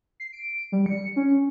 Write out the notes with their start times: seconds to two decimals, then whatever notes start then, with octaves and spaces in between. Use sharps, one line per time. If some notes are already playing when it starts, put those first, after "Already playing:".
0.20 C7
0.33 D7
0.72 G3
0.86 C#7
1.16 C#4